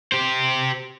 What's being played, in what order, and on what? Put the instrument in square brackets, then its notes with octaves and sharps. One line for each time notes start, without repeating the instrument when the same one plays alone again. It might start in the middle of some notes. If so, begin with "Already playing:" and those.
[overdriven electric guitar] G4 C5